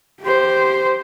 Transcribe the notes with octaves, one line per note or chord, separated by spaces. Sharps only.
G4 C5